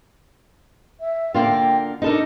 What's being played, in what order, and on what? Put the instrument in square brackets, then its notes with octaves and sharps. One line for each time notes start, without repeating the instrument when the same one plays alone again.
[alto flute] E5
[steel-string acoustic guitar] D3 A#3 F4 [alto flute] G5
[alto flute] D4 [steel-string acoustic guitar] D#4 A4 A#4